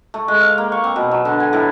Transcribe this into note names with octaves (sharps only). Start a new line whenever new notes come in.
A3
G#3
F5
A#3
C#6
C4
B2
F#3
D3
G#5
A2